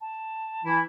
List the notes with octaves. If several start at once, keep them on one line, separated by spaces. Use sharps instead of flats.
A5
E3 E4